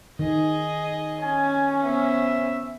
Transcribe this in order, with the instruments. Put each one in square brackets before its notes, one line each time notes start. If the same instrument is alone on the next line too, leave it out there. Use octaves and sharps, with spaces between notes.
[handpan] D#3 [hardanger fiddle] G#4 D#5
[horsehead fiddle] C#4 [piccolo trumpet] G#5
[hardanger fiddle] B3 C5 [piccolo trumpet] E5